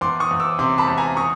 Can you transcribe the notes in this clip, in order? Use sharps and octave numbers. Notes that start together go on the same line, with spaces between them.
E2 C6 D6
C#6 D#6
E2
D6 E6
C3 C6 D6
A5 B5
E2
G#5 A#5
C#6 D#6